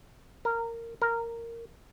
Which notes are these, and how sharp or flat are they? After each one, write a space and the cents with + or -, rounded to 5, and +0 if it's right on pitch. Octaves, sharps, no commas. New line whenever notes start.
A#4 -15
A#4 -10